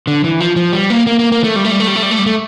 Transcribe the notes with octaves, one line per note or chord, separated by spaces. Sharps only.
D3
E3
F3
F3
G3
A#3
A#3
A#3
A#3
A3
G3
A3
G3
A3
G3
A3
G3
A3
G3
A3